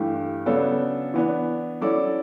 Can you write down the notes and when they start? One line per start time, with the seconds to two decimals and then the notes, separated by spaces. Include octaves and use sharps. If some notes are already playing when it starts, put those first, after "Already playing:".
Already playing: G2 E3 A3 E4 G4
0.46 C#3 F#3 B3 D4 A4
1.14 E3 B3 D4
1.81 F#3 C#4 E4 A4 D5